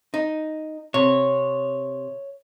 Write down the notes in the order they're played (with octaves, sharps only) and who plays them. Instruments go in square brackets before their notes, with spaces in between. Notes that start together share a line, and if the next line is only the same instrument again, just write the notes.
[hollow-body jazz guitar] D#4
[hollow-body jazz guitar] C3 [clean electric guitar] C#5